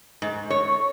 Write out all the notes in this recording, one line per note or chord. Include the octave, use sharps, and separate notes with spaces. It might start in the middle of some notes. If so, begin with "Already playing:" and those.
G#2
C#5